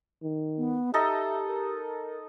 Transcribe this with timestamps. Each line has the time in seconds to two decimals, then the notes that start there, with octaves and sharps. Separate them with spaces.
0.23 D#3
0.58 B3
0.94 D#4 G4 A4 D#5 E5
1.47 A#4